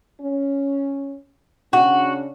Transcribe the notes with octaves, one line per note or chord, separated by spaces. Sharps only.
C#4
C#3 C#4 D4 F#4